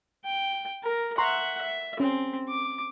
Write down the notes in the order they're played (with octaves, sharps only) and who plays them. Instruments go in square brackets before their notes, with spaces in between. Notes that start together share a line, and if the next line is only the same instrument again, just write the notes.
[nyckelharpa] G5
A#4
[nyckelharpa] E5 F#5 [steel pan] A#5 C6 C#6
[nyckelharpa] E5
[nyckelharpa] C4 [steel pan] C#4
[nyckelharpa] D6